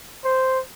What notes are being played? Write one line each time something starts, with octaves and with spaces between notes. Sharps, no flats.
C5